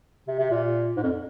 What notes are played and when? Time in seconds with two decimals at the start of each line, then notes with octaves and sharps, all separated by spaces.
0.28 C3
0.39 C3
0.51 A#2
0.97 G#2
1.03 F2